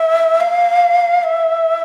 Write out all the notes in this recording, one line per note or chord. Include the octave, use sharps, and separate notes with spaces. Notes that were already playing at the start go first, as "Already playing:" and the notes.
Already playing: E5
F5
E5